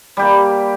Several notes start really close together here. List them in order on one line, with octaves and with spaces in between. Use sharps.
G3 G4 A#3